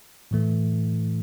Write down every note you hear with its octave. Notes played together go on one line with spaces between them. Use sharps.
A2 E3 A3